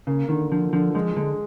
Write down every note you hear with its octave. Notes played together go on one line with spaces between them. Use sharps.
C#3 A#3
D3 D#3
D3 F3
D3 F3
F3 G#3
D3 G#3